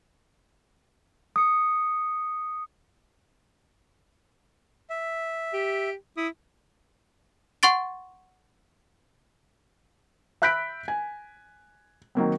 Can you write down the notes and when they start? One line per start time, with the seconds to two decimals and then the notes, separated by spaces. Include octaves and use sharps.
1.36 D#6 C#7
4.90 E5
5.54 G4
6.17 E4 D#6
7.63 F#5 C6 C#6 A6 D7
10.42 E5 B5 F#6 G6 B6 D7
10.88 G#5
12.15 D#3 F#3 A#3 C4